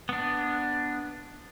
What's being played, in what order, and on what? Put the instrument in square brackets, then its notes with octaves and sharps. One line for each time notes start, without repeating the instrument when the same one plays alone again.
[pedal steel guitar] B3 D4